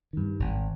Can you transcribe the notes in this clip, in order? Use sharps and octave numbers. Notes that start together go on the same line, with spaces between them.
G2 D#3
G#1